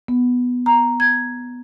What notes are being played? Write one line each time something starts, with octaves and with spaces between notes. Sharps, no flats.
B3
A#5
G#6